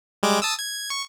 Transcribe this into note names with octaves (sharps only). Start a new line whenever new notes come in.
G3 G#3 D6
A5 D#6 E6
G#6
C#6